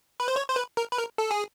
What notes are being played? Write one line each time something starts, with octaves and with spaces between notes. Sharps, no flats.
B4
C5
C#5
C5
B4
A#4
B4
A#4
A4
G#4